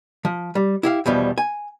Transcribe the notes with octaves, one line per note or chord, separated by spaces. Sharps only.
F3
G3
E4 G4 F5
E2 B2 F3 G3
G#5